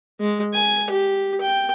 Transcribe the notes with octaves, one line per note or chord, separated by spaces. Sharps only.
G#3
G#5
G4
G5